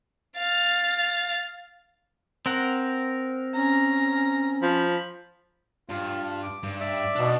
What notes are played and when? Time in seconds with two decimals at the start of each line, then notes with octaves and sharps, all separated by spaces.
0.37 F5 A6
2.46 C4 A#4 F#5
3.56 C#4 A#5
4.63 F3 B5
5.89 G2 F4
6.43 D6
6.63 G2
6.80 D5 E5 D6
7.16 B2 D4 D#4